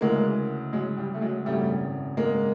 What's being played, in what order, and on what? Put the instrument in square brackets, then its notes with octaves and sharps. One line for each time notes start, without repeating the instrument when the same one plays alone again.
[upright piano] D2 C#3 E3 G#3 A#3
F#3 G#3
G3
A3
F#3 G#3
G#1 F#2 C#3 E3 G3 A3
G#3 A#3